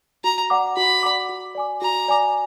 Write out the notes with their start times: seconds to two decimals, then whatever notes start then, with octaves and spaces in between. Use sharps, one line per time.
0.24 F#4 A#5
0.50 D5 F#5 A#5 D6
0.77 F#4 B5
1.03 D5 F#5 A#5 D6
1.29 F#4
1.55 D5 G#5 D6
1.82 F#4 A#5
2.08 D5 G#5 D6